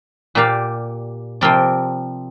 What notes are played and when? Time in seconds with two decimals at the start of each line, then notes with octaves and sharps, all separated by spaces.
0.35 A#2 A#3 G4 D5 F5
1.41 C3 F3 C4 A#4 D5